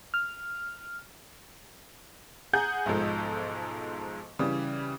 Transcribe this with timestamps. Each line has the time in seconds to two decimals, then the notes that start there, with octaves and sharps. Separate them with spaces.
0.14 F6
2.53 G#4 F#5 G#5 A#5 D#6 G6
2.86 B1 G#2 F3 G#3 A4
4.39 C#3 E3 G3